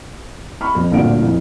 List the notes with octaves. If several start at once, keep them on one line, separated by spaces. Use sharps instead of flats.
B5 C#6 F6
F2
G1 D2 A#2 D3 F5 D7
F2 E3